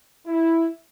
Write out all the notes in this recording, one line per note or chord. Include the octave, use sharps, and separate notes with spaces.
E4